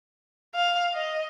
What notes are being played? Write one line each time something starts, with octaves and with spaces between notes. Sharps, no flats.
F5
D#5